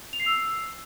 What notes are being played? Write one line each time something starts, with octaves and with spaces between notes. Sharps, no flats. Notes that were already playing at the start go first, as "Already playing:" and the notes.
F7
C7
E6